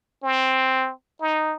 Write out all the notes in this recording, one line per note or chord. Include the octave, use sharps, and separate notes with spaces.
C4
D#4